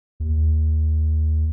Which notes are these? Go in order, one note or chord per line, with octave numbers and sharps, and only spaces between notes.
D#2